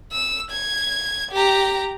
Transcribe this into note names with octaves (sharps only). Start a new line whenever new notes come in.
E6
G#6
G4 A#5